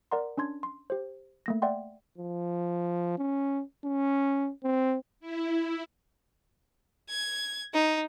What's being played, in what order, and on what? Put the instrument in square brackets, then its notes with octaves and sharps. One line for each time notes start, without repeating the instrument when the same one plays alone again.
[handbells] A#4 D5 F#5 A#5 C6
C#4 D4 C6 G#6
C6
G4 C5
A3 A#3 A#6
D5 E5 F#5 G5 C6
[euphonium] F3
C#4
C#4
C4
[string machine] E4
[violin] G#6
D#4